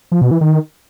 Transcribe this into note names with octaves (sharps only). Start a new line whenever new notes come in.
F3
B2
E3
D#3